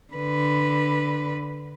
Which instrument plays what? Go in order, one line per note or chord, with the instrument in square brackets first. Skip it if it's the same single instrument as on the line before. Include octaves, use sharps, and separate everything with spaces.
[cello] D3 B4